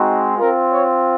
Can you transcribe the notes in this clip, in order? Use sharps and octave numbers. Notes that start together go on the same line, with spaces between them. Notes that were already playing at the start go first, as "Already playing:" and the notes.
Already playing: G#3 C4 D#4 F#4
C4 F4 A#4
C#5